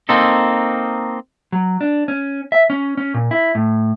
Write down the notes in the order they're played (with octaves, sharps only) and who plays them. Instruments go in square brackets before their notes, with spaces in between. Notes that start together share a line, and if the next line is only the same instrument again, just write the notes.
[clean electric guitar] A#3 C4 D#4 A4
F#3
D4
C#4
E5
C#4
C#4
A#2
E4
A2